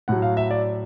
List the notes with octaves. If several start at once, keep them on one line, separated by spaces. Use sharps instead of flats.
A2 F#3 F#5
F5
E5
D5